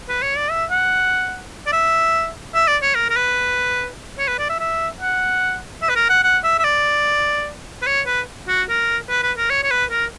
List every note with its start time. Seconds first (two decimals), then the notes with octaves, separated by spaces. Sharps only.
0.09 B4
0.22 C#5
0.37 D5
0.51 E5
0.71 F#5
1.66 D5
1.73 E5
2.55 E5
2.68 D5
2.82 C#5
2.95 A#4
3.10 A#4
3.16 B4
4.18 C#5
4.28 B4
4.39 D5
4.50 E5
4.60 E5
5.01 F#5
5.82 E5
5.89 B4
5.96 A#4
6.10 F#5
6.24 F#5
6.44 E5
6.59 E5
6.64 D5
7.82 B4
7.87 C#5
8.07 B4
8.48 F#4
8.69 A#4
9.09 B4
9.23 B4
9.37 A#4
9.50 C#5
9.63 C#5
9.71 B4
9.91 A#4